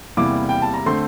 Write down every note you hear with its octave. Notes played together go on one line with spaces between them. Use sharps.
E2 C3 G3 A#3 E4 D6
G5
A5
A#5
D3 A3 C4 C6